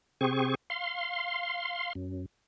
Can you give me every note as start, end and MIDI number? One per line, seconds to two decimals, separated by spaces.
0.21 0.55 48
0.21 0.55 60
0.21 0.55 68
0.21 0.55 85
0.70 1.93 77
0.70 1.93 84
1.95 2.26 42